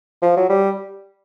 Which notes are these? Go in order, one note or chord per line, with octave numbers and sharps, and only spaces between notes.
F3
F#3
G3